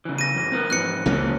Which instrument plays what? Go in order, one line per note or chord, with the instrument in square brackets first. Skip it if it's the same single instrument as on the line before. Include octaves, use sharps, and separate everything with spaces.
[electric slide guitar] C#3 E3
[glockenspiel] A#6 D#7
[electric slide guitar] F#2 E3
C4 A#4 B4
[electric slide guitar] F2 G#2 E3 [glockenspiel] F#6 C#7
[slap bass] C#2 F#3 A#3 [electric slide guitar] E3 C4 C#4